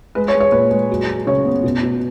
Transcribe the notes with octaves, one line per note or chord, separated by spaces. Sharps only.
G#3 B4
C#5
G#3
C#5
A#2 B4
G#3
F#3
F#3
C#3 C#5
B3
B2
B2